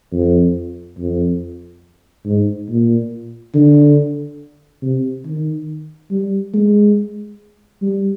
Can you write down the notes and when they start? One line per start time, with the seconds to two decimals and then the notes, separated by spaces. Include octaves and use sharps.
0.13 F2
0.98 F2
2.25 G#2
2.69 A#2
3.54 D3
4.82 C3
5.25 D#3
6.11 G3
6.54 G#3
7.82 G3